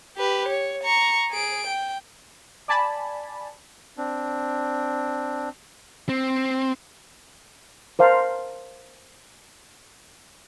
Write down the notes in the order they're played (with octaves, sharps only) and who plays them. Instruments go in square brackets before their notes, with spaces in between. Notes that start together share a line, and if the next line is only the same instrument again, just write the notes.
[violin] G4 B4
C#5
A#5 C#6
G#4 D7
G5
[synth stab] D5 G#5 A5 B5
[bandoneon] C4 D4
[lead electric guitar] C4
[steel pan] A#4 C5 F5 A5 C6